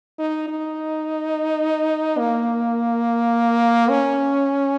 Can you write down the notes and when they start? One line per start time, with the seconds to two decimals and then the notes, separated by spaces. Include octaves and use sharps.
0.19 D#4
0.48 D#4
2.18 A#3
3.89 C#4